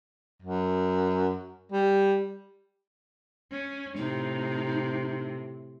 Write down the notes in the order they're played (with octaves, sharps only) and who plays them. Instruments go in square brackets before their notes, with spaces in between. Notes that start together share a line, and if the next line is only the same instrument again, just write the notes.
[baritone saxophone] F#2
G3
[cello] C#4
[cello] A2 C3 [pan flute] D#4